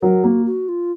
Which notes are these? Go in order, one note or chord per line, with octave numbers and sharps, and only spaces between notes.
F#3 A#4
A#3 F#4
F#4
F4